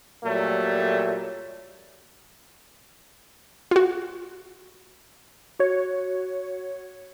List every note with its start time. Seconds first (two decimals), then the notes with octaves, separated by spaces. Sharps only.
0.24 A#2 F#3 G3 A3
3.71 F4 F#4
5.59 F#4 C#5